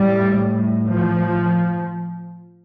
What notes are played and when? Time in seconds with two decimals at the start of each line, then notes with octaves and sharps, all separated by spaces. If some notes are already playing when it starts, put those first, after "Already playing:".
Already playing: A2 G3
0.89 F3